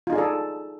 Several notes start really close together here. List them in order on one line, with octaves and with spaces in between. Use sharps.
F4 D#4 G#4 D5 A4